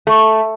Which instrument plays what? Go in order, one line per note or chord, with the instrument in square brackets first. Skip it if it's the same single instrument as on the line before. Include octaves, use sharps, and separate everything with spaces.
[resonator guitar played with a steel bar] A3